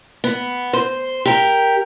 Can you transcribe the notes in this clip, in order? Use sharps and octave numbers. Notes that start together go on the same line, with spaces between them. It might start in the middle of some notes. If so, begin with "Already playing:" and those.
B3
C5
G4 A#4